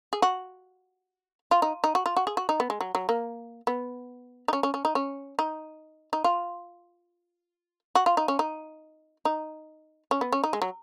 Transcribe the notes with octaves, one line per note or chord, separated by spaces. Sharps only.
G#4
F#4
F4
D#4
D#4
F#4
F4
F#4
G#4
F#4
D#4
B3
G#3
F#3
F#3
A#3
B3
D#4
C#4
C#4
C#4
D#4
C#4
D#4
D#4
F4
F#4
F4
D#4
C#4
D#4
D#4
C#4
B3
C#4
D#4
G#3
F#3